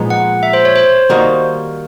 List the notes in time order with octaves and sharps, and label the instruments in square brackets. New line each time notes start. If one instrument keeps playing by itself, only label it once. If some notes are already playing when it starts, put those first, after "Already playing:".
Already playing: [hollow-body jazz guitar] A#2 F3 G#3 B3 D#4
[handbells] F#5
E5
C5
C#5
C5
[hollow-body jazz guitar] D#3 G3 A#3 D#4 F#4